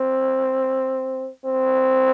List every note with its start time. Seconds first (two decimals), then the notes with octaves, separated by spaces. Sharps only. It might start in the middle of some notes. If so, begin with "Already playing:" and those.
Already playing: C4
1.45 C4